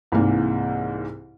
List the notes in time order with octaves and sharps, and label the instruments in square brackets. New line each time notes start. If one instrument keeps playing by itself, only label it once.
[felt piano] C2 G#2 C3 E3 A#3